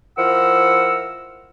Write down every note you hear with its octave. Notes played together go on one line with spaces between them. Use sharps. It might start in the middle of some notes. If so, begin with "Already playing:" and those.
F3 E4 A#4 F#5 E6